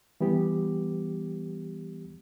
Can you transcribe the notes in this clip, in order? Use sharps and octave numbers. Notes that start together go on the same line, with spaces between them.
E3 G3 B3 G4